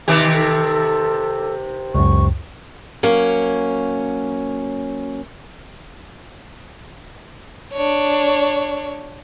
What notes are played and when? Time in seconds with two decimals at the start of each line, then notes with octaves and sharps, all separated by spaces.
0.08 C3 D#3 G4 D6
0.33 A4
1.95 C#2 F#2 C#6
3.03 F#3 A#3 C#4
7.73 D4 C#5